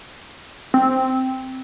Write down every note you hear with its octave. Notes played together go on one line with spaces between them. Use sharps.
C4